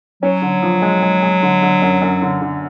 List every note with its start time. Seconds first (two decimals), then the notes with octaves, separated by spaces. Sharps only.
0.23 F#3 C#4
0.42 D3
0.63 F3
0.82 G#3
1.02 G#3
1.22 G#3
1.43 D3
1.62 D3
1.82 F#2
2.02 F#2
2.22 D3
2.42 D3